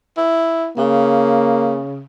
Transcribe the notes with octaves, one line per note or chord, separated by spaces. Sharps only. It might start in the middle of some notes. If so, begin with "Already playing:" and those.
E4
C#3 A#3